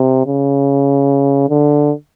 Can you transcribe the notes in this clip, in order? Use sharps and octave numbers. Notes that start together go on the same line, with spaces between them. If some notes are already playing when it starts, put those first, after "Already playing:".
Already playing: C3
C#3
D3